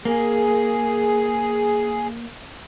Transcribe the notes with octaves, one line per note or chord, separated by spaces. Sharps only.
A#3 G#4